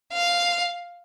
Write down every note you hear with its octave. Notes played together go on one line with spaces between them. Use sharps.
F5